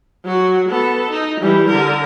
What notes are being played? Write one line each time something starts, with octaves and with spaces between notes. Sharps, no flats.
F#3 F#4
B3 A4
D#4
E3 G3
D3 A#4